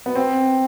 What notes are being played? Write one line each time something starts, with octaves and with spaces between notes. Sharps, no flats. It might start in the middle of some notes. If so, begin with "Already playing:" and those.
B3
C4